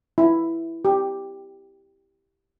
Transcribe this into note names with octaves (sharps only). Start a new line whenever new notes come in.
E4
G4